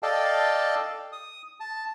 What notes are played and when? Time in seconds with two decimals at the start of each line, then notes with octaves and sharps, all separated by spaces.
0.03 A4 D5 D#5 F5 G5 A5
1.12 D#6
1.60 A5